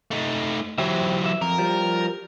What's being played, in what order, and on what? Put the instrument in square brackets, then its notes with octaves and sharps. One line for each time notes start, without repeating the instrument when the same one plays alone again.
[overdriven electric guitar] A3 D#4
[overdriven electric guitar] E3 F#3 [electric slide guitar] G4 C5 E5
[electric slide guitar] E5
[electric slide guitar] F2 [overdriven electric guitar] A#4
[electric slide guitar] F3 G3